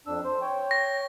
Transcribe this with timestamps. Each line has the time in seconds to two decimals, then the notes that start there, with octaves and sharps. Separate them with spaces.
0.07 F2 D4 E6
0.24 C5
0.42 C#5 G5
0.71 A#6